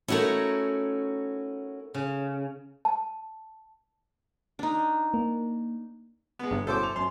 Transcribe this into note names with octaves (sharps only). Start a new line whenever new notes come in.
A3 C#4 D#4 E4 F#4 A#4
C#3
A5
D4 D#4
A#3
G#3 B3
G1
B2 C#4 E4 A4 C5 D6
F7
F#2 C6